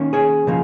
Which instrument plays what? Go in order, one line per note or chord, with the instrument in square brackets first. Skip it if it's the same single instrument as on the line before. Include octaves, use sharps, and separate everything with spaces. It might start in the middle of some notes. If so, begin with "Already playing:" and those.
Already playing: [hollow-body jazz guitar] D#3 A#3 C#4
G#4 C#5
C#3 F3 A#3